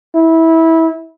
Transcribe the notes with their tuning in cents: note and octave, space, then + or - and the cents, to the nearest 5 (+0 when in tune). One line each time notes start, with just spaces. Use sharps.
E4 -20